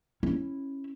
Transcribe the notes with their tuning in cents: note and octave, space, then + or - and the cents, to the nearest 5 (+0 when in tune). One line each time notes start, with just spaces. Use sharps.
C#4 -20 E4 +0